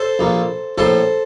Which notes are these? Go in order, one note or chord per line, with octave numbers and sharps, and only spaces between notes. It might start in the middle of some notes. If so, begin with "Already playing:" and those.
Already playing: A4 C5
A#1 A#2
A#1 A2 A4 C5